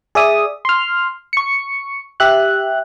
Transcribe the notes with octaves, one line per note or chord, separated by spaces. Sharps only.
G#4 D5 E5 D#6
C6 F6
C#6 C#7
G4 E5 F#6